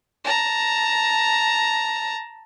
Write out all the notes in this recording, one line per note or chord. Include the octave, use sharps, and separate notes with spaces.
A5 A#5